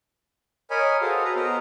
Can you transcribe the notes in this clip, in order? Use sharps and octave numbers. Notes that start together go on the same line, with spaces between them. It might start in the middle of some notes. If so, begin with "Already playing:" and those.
A#4 C#5 D#5 G#5 B5
F#4 G#4 A4 C5 F5
B4 A#5
B3 F#4 A#4 C5 D#5 A#5